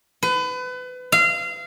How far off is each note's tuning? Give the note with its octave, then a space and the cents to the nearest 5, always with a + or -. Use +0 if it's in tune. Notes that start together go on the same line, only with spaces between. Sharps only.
B4 +30
F5 -25